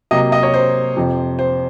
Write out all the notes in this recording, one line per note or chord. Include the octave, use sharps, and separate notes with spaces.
C3 F#3 A#3 D#5
D#5
C#5
C5
F2 C3 F3
C5